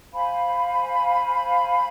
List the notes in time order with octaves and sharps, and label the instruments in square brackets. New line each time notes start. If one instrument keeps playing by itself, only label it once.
[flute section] C5 F5 G#5 B5